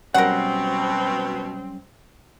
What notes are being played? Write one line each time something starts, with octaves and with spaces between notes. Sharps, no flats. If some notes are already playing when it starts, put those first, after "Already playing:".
B2 F#3 G3 C4 C#4 A#4 F#5